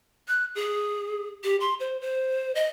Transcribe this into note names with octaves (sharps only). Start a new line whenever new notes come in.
F#6
G#4
G4
C6
C5
C5
D#5